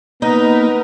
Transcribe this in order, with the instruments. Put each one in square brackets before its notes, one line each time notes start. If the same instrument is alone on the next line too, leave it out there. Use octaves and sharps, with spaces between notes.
[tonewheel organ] A#3 [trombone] B3 [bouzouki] D#4 [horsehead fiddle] A#4 B4